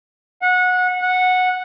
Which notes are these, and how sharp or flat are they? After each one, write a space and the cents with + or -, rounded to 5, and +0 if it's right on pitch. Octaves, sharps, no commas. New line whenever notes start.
F#5 -20
F#5 -10